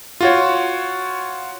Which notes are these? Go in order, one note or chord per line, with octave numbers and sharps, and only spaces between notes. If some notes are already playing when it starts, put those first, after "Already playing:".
F4 F#4 C#5